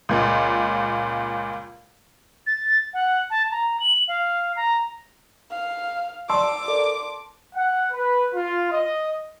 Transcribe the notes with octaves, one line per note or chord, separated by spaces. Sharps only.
C#2 A#2
A6
F#5
A5
A#5
F#7
F5
A#5
F5
D5 A5 C6 D6 E6
A4 A#4 D5
F#5
B4
F4
D#5